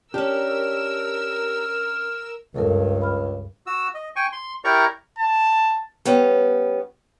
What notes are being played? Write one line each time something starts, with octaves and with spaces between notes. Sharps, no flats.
C#4 D4 G4 A#4 E6 F6
C#2 G2 G#3 A4 A#4
B5 F6
F#4 E6
D#5
G5 G#5 C#6
C6
E4 G4 A#4 D5 A#5 C#6
A5
G3 B3 C#4